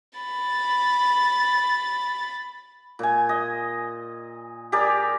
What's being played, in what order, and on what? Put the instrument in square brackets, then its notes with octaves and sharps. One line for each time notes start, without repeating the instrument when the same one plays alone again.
[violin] B5 A6
[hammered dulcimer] A#2 G#5
D#5
G4 G#4 A#4 D5